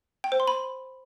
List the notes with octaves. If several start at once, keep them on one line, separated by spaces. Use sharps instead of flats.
G5
C5
C6
B5